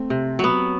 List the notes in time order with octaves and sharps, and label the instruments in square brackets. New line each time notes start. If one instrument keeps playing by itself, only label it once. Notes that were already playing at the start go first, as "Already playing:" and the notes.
Already playing: [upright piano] A3 C4
[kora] C3
F#3 B3